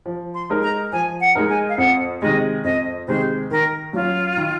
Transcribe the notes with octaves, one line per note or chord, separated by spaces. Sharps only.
F3
C6
G#3 D#4 A#4
A#5
F3 G#5
F#5
G#3 D#4 A#4
G#5
F5
F2 F#5
C3 D#3 G#3 D#5
F2 D#5
C3 D#3 G#3 C5
D#3 A#4
F#3 C#4 F4
D#3